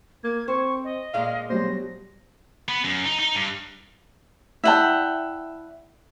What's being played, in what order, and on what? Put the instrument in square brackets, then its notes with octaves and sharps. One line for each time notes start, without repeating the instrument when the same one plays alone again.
[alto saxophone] A#3 [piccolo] G#6
[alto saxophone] C4 [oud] C5 [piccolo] C#6
[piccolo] D#5
[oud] A#2 G#3 D4 [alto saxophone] F5
[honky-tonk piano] B2 F#3 G3 [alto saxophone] C5 [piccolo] A#6
[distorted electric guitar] B3
F#2
D#4
D#4
G2
[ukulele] E4 D5 A5 [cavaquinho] E5 F#5 G5